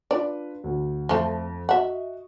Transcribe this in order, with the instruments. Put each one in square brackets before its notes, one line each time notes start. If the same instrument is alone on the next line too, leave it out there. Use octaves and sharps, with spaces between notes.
[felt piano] D4 F4 B4 [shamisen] D5
[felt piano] D2
[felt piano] F2 [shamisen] F3 A3
[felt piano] F#4 D#5 [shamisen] E5 F#5